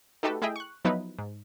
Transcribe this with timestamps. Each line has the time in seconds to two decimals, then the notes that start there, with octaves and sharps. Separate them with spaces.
0.23 A3 D#4 F#4 G4 A4 B4
0.42 A3 E4 G#4 D#5 E5 G5
0.56 C#6 F#6
0.85 F3 F#3 B3 D#4 E4 B4
1.18 G#2